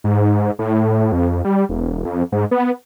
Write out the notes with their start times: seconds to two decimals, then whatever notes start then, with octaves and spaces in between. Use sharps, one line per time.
0.04 G#2
0.59 A2
1.12 F2
1.44 G3
1.69 E1
2.05 F2
2.32 G#2
2.51 B3